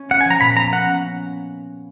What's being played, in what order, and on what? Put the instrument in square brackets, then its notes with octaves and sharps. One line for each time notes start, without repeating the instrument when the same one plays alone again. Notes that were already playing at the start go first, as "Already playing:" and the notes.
Already playing: [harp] C#4
[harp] B3 [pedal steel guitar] F#5
[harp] F3 [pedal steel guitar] G#5
[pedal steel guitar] A#5
[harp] A#2 [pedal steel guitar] B5
[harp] B3 [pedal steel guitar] A#5
[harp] C#4 [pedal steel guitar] F#5
[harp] C#4